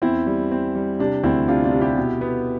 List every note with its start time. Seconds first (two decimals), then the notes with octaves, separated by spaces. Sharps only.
0.02 E2 C4 E4
0.27 G3
0.51 C4
0.75 G3
0.99 C3 D4
1.23 D2 C4 E4
1.48 C3 D4 F4
1.64 D4 F4
1.72 C3
1.80 E4 G4
1.97 B2
2.21 B3